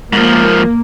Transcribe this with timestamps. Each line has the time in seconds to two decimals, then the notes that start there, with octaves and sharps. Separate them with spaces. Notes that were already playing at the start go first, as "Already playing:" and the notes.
0.13 G#2 F3 A#3